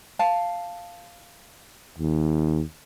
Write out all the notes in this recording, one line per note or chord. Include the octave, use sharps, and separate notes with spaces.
F5 A5
D#2